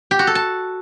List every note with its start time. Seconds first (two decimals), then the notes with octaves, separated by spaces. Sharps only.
0.11 G4
0.19 F#4
0.27 A4
0.35 A5